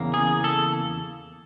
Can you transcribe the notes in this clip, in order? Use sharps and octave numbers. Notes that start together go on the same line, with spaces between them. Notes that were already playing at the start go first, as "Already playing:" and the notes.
Already playing: E2 C#3 A#3
G#4
A4